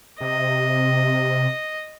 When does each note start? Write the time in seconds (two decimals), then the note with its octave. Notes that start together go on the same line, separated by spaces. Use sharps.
0.21 C3 D#5